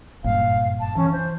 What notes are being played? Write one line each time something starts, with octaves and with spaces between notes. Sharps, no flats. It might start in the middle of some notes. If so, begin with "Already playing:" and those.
F#1 G2 A#2 F5
A5
E3 C#4
C5